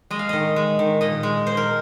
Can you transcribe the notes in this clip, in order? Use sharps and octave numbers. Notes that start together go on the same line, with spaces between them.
G#3 D#5
F5
D#3 D#5
G#3
D#3
A#2 D#5
G#3
A#2 C5
A#4